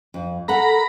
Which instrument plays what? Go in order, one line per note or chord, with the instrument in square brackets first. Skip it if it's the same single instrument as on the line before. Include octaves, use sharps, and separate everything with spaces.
[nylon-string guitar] F2
[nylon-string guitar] A4 A#4 F#5 [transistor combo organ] A#5 B5